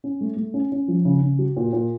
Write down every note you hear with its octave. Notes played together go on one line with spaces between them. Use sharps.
C#4
A3
A3
C#4
C#4
F3
C#3
C#3
F#3
A#2
A#2